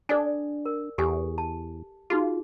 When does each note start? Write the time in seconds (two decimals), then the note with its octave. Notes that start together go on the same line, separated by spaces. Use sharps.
0.09 D4 A4 D5 G#5
0.66 A#4
0.98 E2 G4 A4 G#5
1.38 A5
2.10 D#4 F4 F#4 G#4